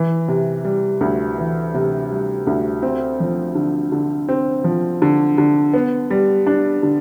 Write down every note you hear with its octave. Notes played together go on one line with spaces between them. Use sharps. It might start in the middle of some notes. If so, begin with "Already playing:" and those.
Already playing: E3
C3
G3
D2
E3
C3
G3
D2
C4
F3
D3
D3
C4
F3
D3
D3
B3
G3
D4
D3